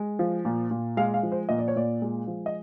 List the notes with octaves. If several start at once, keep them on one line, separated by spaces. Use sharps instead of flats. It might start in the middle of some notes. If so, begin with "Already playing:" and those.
Already playing: G#3
F3
A#2
A#2
G#3 F5
F5
F3
C5
A#2 D#5
D5
C#5
A#2 D5
G#3
F3
D#5